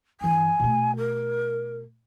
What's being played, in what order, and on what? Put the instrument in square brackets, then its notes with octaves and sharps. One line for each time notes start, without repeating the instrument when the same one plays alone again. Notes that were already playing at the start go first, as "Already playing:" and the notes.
[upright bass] G2 E3 [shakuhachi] G#5
[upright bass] B2 A3
[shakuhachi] A#4